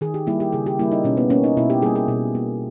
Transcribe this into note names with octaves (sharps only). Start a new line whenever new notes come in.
D#3 G#4
G4
G3 A#3 E4
G4
C#3 G#4
G4
G3 A#3 E4
D#4
B2 C#4
B3
A#3 C#4
D#4
B2 E4
G4
G3 A#3 G#4
G#4
B2
A#3